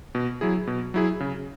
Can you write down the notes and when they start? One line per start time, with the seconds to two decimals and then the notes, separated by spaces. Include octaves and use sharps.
0.15 B2
0.41 F#3 E4 G#4
0.67 B2
0.94 F#3 E4 G#4
1.20 C#3